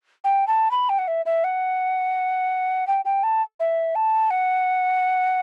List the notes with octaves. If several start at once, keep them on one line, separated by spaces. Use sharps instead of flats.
G5
A5
B5
G5
F#5
E5
E5
F#5
G5
G5
A5
E5
A5
F#5